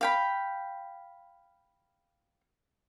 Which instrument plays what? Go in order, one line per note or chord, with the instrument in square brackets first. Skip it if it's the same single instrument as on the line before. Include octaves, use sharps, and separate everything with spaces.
[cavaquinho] F5 G5 B5